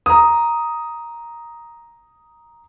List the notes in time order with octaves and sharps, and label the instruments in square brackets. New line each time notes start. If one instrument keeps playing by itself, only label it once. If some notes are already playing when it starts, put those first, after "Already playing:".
[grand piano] A#5 D#6